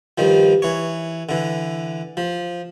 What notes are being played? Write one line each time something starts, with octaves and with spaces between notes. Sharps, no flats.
G2 D#3 F3
E3 C#5
D3 E3
F3